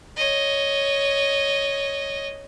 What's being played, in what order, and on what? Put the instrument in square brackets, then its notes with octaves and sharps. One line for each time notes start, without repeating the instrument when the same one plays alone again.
[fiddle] C#5 D#5